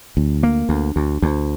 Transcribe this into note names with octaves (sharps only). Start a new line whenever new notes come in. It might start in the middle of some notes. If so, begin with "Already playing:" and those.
D2
A#3
D2
D2
D2